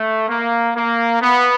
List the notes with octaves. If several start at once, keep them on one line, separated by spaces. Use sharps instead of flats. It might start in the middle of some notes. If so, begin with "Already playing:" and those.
Already playing: A3
A#3
A#3
B3